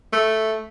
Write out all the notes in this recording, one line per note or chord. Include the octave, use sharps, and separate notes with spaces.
A3